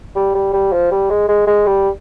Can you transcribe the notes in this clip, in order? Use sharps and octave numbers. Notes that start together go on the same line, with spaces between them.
G3
G3
G3
F3
G3
G#3
G#3
G#3
G3